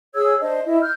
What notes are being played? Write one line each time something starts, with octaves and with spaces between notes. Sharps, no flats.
G#4 C#5 E6 G#6
D4 C5 D#5
E4 D#5
F6 G6